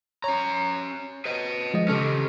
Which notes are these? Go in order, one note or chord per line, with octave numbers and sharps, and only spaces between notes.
C#4 C#5 A#5
B4 D#5
F3 G#3 D#5
C#3 C#4 G4 A4 F6